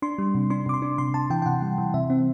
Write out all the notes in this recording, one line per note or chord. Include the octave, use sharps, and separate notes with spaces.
D4 C6
G3
C3
D4 C6
C3 D6
C6
D4
C3 C6
C3 A5
E3 G5
G5
C3 F#5
G3
E3
C3 E5
C4